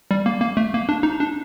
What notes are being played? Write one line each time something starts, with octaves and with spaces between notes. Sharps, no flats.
G3
A#3
A#3
A3
A#3
D4
D#4
D4